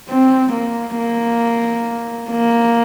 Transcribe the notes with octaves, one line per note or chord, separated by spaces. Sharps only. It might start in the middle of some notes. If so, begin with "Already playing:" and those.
C4
A#3
A#3
A#3